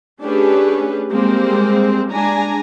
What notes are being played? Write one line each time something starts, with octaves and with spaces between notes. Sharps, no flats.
A3 C#4 D4 G4 G#4 B4
G3 G#3 A#3 C4 C5
G#3 D4 G#5 A#5